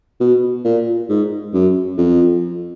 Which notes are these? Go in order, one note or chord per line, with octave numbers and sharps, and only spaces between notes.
B2
A#2
G#2
F#2
F2